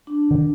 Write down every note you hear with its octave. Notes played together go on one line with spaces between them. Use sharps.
D4
D#3